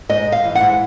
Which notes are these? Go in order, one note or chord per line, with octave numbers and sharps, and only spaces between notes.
G#2 D#5
G#2
F5
E3
F#5
G#2